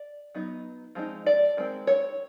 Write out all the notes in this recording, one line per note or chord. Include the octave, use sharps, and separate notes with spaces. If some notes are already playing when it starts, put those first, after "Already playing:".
Already playing: D5
F#3 B3 D#4
F3 G#3 C4 D#4
D5
D#3 G#3 C4
C#5